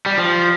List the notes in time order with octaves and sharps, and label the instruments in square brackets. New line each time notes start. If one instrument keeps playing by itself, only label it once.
[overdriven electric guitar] G3
F3